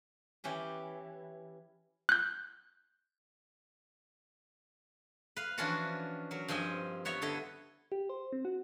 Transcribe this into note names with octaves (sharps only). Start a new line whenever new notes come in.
E3 C#4 G4
F#6 G6
B4 F5
E3 F3 C#4 D4 F4 F#4
F#3 A#4
G2 F3 C4 D#5 G#5
B3 C#5 E5 A#5
D3 E4 D#5
G4
C5
C4
F#4